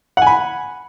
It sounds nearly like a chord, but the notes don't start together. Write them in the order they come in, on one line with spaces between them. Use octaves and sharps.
F#5 G#5 B5